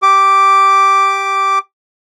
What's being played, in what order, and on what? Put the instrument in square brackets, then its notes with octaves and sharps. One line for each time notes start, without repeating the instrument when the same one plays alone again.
[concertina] G4 D6